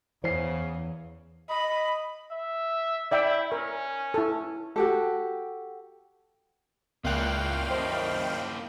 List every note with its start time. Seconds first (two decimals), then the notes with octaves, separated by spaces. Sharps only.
0.24 E2 C#3 E3 C5 C7
1.50 D#5 B5
2.31 E5
3.12 E4 D5 E5 G5
3.52 C#4 A#4
4.14 E4 A4
4.76 F#4 G4 A4
7.05 C#2 A#2 A#3 E4 F5 G5 F#6
7.70 F#2 D#3 C5 D#5